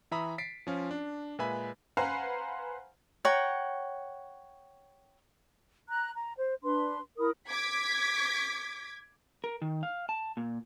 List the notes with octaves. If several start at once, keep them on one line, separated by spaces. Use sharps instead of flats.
E3 E5 A#5 B5 D#6
A6 B6 C7 D7
F3 C#4 F4
D4
A#2 G#3 B4 E5 G#5 B5
B4 C5 F5 F#5 G#5 A#5
C#5 F#5 G5 A#5
A#5 F#6
A#5
C5
D4 B4 C6
E4 A#4 B5 D#6
D6 G#6 B6
A#4
D#3
F5
A5
A#2